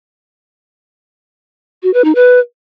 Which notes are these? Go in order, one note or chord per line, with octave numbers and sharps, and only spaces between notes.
F#4
B4
D#4
B4